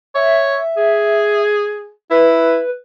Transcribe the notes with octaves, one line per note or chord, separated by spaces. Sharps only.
C#5 E5
G#4
E4 B4